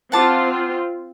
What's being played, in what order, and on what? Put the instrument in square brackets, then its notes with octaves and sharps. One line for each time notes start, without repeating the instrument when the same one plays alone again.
[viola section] C4 F4 [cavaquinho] F#5 A5 D6